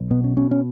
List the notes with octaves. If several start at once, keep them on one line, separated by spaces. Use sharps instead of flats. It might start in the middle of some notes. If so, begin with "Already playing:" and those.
Already playing: B1
B2 B3
C#4
B2 C#4
C#4